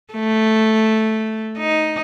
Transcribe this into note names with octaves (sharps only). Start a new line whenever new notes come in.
A3
D#4